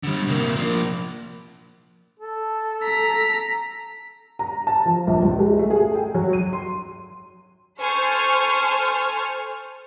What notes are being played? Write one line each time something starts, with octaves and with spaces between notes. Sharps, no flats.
D3 G3
C3 A#3
F3 A#3
A4
A#5 B6
A#5
A5
F3
A#1
C#2
G#3
A3
G#4
G5
F#3
D#7
C6
A4 C5 G#5 C#6 F6